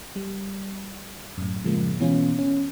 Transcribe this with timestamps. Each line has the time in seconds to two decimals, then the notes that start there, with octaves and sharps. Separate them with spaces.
0.16 G3
1.38 F#2 A2
1.63 A2 C#3 F3 G#3 A#3
1.99 B2 E3 B3 C#4 F4
2.38 C#4